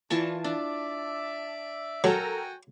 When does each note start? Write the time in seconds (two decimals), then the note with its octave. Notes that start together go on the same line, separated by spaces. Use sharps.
0.10 A#2 E3 F4 A5 C#6
0.44 D4 D5 E5
2.04 F#3 F#4 A4 A#4 G5 G#5 A#5